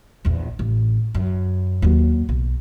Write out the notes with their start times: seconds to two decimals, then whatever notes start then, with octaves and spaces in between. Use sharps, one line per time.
0.25 A#1 E2
0.59 A1
1.15 F#2
1.82 D#2 F#3
2.29 B1